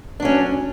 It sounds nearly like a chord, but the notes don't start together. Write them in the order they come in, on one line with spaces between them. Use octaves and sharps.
D4 F#3 C#4